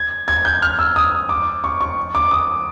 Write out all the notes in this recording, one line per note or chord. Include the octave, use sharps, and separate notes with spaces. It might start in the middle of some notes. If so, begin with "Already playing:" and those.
Already playing: G#6
G#6
G6
F6
E6
D#6
D6
C#6
C#6
D6
D#6